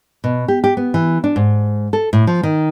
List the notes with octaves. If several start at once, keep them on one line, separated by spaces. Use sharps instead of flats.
B2
G4
G4
B3
E3
D4
G#2
A4
A2
F3
D#3